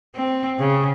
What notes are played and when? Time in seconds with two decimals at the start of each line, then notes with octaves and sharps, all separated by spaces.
0.15 C4
0.59 C#3